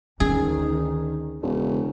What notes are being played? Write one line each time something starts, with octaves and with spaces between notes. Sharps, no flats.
D2 D#3 C#4 D#4 G#4
E1 C#3